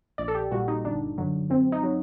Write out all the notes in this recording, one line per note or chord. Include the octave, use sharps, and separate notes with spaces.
A#1 D5
A4
G4
A#2 G3 F#4
D#4
G1 D4
F#2 D3 F#3
F#2 C4
D#4
F#3